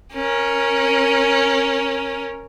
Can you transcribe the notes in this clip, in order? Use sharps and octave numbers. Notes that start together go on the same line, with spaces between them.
C#4 A#4